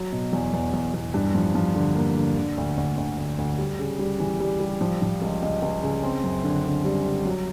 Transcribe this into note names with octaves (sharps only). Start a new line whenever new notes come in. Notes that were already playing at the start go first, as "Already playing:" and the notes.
Already playing: F#3
B2
E2
E2
E2
E2
G2
F3
F3
D3
A#3
D3
D3
D2
D2
D2
D2
D2
G3
C#3
G3
E3
G3
G3
F3
F3
C#2
C#2
C#2
C#3
C4
F#2
D3
D3
G3
D3
F#3